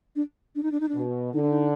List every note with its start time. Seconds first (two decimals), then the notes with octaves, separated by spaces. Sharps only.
0.16 D4
0.55 D4
0.63 D#4
0.72 D4
0.80 D#4
0.89 D4
0.94 B2
1.33 D3 D#4
1.42 D4
1.50 D#4